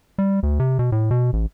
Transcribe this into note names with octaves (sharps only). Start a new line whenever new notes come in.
G3
D2
C3
B2
A2
B2
A1